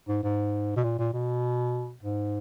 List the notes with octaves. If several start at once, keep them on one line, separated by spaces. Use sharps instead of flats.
G#2
G#2
B2
A#2
A#2
B2
G#2